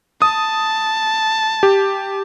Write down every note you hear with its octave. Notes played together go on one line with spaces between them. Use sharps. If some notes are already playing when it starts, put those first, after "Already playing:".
A5 D#6
G4